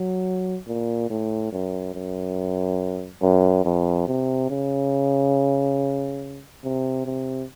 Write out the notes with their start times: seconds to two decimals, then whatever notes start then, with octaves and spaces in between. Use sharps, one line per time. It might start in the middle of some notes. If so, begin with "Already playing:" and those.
Already playing: F#3
0.67 A#2
1.10 A2
1.52 F#2
1.95 F#2
3.22 F#2
3.65 F2
4.07 C3
4.50 C#3
6.64 C3
7.06 C3